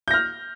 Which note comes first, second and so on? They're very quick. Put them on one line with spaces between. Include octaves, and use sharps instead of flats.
G6 A#6 F6